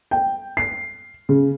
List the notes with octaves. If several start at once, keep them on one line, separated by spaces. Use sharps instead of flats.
G5
C7
C#3